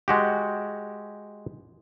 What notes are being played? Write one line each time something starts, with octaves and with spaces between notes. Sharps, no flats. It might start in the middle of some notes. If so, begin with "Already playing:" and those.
G#3 F#4 G4